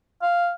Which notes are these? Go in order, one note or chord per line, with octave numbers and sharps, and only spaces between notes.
F5